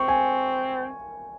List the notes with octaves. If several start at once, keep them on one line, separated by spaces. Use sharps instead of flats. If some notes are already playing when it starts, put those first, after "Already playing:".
Already playing: C4 C#6
G#5